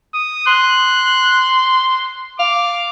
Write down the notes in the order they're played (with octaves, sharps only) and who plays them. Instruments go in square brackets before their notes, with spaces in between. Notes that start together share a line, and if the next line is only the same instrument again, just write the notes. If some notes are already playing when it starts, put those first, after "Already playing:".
[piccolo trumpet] D#6
[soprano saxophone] C6 [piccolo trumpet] F#6
[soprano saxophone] F5 [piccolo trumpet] D6